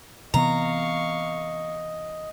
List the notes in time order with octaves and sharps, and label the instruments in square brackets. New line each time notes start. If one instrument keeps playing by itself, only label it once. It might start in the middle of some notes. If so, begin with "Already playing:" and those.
[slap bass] C3 E3 B3 [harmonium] D#5 [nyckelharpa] F5 C#6 [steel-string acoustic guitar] A#5